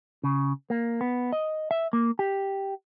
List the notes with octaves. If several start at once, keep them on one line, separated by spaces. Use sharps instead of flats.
C#3
A#3
B3
D#5
E5
A#3
G4